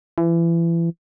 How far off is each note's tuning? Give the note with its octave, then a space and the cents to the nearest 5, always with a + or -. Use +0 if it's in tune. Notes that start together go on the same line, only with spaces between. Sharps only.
E3 +30